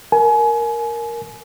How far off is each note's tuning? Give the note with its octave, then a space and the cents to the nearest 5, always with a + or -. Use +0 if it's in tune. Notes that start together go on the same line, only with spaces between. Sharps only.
A#4 +0 G#5 +30